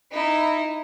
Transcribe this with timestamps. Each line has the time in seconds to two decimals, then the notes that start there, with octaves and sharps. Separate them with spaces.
0.11 D#4 E4